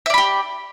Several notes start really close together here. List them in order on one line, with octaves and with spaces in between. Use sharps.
E5 D5 B5 G4